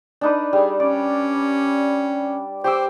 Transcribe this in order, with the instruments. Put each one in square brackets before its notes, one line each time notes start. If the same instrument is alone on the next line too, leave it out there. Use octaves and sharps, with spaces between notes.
[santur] D4 D#4 B4
[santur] G3 [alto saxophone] G#4
[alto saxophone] C#4 [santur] D5
[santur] G4 D6 E6 [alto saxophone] C5